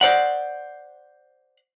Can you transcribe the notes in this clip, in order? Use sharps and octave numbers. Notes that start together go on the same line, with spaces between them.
C5 D5 F#5